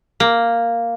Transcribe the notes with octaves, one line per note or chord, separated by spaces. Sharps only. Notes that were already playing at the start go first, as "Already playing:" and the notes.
A#3